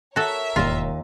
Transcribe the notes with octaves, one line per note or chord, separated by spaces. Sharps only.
F#4 A4 A#4 C#5 E5
E1 D#2 G#2 F4 D#5 F5